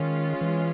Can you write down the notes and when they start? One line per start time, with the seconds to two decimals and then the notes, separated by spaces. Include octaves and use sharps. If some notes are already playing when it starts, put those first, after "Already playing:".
Already playing: D#3 G#3 C#4 F4
0.41 E3